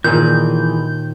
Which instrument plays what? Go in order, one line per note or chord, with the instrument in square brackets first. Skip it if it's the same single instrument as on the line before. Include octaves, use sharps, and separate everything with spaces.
[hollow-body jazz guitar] D#2 D#3 [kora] A#2 [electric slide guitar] E3 G#4 [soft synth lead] G6